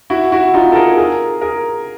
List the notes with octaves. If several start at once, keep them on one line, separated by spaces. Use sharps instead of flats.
E4 F#4
E4 F#4
D#4 F4
A4
G#4 A#4
G#4 A#4
G#4 A#4